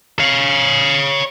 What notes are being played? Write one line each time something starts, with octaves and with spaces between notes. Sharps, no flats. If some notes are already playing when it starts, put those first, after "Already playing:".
C#5 F5